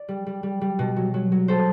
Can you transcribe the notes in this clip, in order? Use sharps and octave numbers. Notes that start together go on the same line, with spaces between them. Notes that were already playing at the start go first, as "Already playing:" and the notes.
Already playing: D5
G3
G3
G3
G3
B2
F#3
F#3
F#3
A4 C5